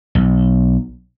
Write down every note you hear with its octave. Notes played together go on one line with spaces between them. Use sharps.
B1